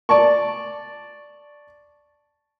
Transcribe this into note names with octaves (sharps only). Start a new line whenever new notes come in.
D5 A5 C#6